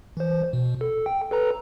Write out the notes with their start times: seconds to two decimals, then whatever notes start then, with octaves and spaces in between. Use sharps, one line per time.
0.17 E3 C5
0.53 B2
0.81 A4
1.06 G5
1.31 A4 B4 A#5